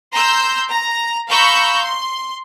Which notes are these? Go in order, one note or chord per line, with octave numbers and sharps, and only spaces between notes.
A#5 C6 E6 G6
A#5
F5 A#5 B5 C#6 E6 G6
C6